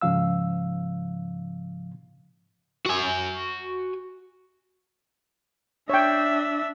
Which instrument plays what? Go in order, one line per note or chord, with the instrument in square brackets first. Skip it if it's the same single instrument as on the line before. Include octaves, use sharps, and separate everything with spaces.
[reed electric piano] G#2 C#3 F3 F5 E6
[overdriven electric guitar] F#4 G#5
[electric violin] D4 E5 [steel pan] C#5 G5